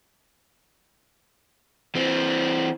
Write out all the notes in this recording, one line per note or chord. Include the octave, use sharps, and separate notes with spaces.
E3 C4